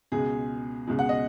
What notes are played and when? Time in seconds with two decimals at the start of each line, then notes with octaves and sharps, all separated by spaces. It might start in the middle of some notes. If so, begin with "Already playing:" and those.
0.12 C#2 B2 G#3 G#4
0.87 C#2 B2 G#3
0.99 F#5
1.09 D#5